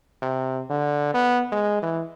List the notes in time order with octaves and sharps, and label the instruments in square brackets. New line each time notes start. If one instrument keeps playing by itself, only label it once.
[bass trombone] C3
D3
B3
G#3
E3